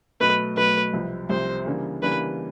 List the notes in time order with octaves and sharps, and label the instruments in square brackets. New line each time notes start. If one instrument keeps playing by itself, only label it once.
[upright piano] B2 F#3 A3 [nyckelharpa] B4
[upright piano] B2 F#3 A3 [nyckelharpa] B4
[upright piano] C2 C3 F3
[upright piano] C2 C3 F3 [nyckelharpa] C5
[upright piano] C#3 E3 G3 A#3 D4
[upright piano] C#3 E3 G3 A#3 D4 [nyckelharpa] B4